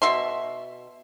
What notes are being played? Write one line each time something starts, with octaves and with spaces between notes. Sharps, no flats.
B2 E5 C6